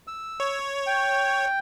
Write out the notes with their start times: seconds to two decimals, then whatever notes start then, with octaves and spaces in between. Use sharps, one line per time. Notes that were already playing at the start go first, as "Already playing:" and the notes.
0.07 E6
0.40 C#5
0.87 G5